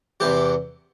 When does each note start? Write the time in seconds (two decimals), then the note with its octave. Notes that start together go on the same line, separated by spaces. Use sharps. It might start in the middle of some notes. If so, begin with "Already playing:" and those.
0.20 E2 C3 E3 G4